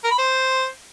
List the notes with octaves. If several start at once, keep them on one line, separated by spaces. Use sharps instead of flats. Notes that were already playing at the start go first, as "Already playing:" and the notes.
A#4
B5
C5